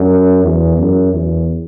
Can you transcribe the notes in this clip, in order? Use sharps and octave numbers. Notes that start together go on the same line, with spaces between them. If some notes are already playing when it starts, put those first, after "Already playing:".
Already playing: F#2
E2
F#2
E2